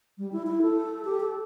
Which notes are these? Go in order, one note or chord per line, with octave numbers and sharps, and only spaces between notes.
G3
E4
E4
A4
G4
A4